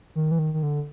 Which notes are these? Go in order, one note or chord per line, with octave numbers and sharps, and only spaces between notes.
D#3
E3
D#3
D#3
D3